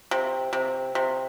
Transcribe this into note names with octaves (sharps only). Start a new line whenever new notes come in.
C3
C3
C3